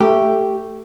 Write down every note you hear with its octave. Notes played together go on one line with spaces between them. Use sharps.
A3 G4